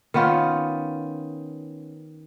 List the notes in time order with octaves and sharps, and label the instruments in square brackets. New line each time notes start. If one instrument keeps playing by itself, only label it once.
[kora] D#3 B3 C#4 F4